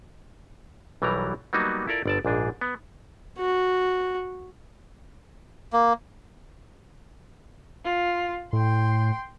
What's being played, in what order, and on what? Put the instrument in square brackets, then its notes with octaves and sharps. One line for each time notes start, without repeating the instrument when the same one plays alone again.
[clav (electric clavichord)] B1 E3 F#3 G3 A#4 A#5
F#3 G3 A#3 B3 D#4 F#4
E4 F4 A4 A#4 D5
G1 D5 A5
A#1 G#2 D4 G#4
B3
[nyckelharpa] F#4
[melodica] A#3
[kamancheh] F4
[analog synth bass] A2 [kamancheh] G5 C6